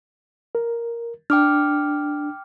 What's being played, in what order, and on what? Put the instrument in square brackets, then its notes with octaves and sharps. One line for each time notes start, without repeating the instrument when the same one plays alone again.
[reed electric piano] A#4
[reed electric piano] D4 [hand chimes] G5 D6 F6